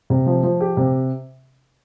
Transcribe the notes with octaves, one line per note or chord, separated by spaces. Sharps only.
C3
F3
F3
G4
C3